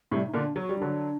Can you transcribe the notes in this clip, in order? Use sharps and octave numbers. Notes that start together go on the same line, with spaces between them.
A2 C3 G3
D#4
A#2 D3 D4
F#3 F#4
G3
D3 F#3 D4